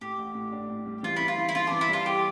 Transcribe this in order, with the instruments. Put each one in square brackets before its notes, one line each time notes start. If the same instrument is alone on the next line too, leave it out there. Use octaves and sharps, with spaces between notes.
[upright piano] A2 [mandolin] G4
[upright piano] A1
A2
D4
A2
G3
[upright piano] E3 [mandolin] F4
[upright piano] E3 [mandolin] E4
[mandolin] F4
[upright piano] E3
[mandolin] E4
[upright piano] E3 [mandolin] F4
[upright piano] E3 [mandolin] D4
[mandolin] E4
[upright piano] G3 [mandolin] F4
[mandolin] G4